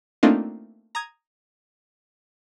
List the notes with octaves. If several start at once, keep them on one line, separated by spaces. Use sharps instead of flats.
A3 A#3 C4 D4 D#4 F4
A#5 D#6 G#6